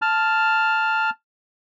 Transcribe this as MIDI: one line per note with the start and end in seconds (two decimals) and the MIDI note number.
0.02 1.10 81
0.02 1.10 89